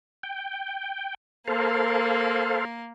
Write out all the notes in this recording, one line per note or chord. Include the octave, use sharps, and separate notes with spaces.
G5
A#3 A4 A#4 C5 F5